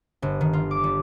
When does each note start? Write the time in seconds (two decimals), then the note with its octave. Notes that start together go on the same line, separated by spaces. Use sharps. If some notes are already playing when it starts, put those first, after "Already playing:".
0.22 G1
0.41 D#3
0.53 F4
0.71 D6
0.84 G3